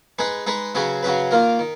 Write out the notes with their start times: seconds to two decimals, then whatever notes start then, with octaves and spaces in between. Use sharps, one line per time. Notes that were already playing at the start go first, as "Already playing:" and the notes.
0.19 G#3 D#4 G#4 B4
0.46 G#3 D#4 G#4 B4
0.75 C#3 F#3 C#4 G#4 B4
1.03 C#3 F#3 C#4 G#4 B4
1.31 D#3 A#3 F4 A#4
1.59 D#3